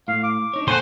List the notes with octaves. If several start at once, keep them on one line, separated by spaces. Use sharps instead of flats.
A2 F5
D6
D4 D#4 C#5
A#3 D#4 A4 C5 F#5 G#5 C6